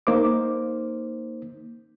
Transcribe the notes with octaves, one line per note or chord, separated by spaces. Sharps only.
A#3 D#4 C5 D6